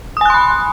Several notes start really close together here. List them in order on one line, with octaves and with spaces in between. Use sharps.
D#6 G#5 F#6 C6 B5